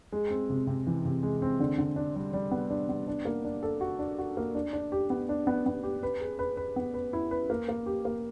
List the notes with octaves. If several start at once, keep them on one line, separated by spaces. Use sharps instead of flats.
G#3
C4
C3
C3
E3
C3
G#3
C4
D3
D3
D4
G3
G3
B3
D4
B3
D4
A#3
D4
A4
F#4
D4
F#4
A#3
D4
D4
G4
B3
D4
B3
B3
G4
B4
G#4
B4
B4
B3
B4
E4
B4
A#3
A#3
G4
A#3